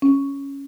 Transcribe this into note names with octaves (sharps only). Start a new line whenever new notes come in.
C#4